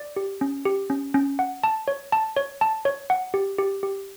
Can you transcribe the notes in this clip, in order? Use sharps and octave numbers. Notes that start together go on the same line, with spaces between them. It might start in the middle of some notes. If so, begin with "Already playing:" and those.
Already playing: D5
G4
C#4
G4
C#4
C#4
F#5
A5
C#5
A5
C#5
A5
C#5
F#5
G4
G4
G4